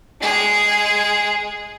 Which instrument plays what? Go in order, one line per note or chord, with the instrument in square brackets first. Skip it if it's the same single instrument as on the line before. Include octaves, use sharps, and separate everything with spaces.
[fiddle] G#3 G#4